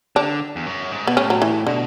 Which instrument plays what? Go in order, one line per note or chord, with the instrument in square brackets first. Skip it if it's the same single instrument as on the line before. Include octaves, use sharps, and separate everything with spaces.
[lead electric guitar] D3 [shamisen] D4
[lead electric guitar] E2
F#2
G#2
[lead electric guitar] B2 [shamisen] B3
[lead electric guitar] A2 [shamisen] C#4
[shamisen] F#3
E3
[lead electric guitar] B2 [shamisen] D3